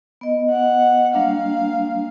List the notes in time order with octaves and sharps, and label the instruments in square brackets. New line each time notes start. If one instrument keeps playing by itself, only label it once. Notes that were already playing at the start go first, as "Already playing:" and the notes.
[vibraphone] B3 D#5
[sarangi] F#5
[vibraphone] G3 A#3 D4 [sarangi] F5